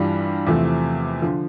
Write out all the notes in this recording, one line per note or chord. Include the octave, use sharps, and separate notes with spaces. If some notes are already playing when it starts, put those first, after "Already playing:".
Already playing: G2 E3 G3 D4 F4
E2 C3 F3 A3
D3 F3